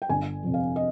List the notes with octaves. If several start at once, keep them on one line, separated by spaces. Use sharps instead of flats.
G5
G1 G#5
F2 C3
F5
D#5